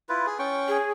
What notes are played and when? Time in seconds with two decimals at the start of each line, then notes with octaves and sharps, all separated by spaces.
0.09 E4 F4 B4
0.27 G#4
0.39 C#4 G5 C#6
0.68 G#4